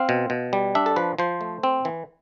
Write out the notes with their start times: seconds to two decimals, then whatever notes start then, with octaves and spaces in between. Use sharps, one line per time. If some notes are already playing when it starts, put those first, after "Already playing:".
Already playing: C4 F5
0.09 B2
0.30 B2
0.53 G3
0.75 D4 E5
0.86 A4
0.96 F3 B4
1.19 F3 C5
1.41 A3
1.63 C4
1.85 E3